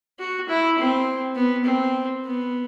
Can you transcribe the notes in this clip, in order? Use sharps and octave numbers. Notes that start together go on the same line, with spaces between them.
F#4
E4
C4
B3
C4
B3